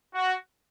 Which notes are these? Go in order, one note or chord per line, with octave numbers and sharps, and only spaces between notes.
F#4